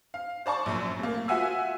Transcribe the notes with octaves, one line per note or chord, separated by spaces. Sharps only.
F5
C5 D5 A5 C#6
A#1 F#2
A3 A#3
F4 F#4 E5 F#5 G#5 E6